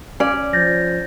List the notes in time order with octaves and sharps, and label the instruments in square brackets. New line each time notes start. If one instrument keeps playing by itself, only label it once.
[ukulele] C#4 D5 [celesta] F5
[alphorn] F3 [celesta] G6 A6 A#6